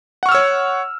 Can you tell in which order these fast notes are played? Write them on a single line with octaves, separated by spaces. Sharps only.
F#5 C#6 F6 E6 C#5